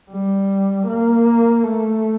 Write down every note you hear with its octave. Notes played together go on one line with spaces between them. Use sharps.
G3
A#3
A3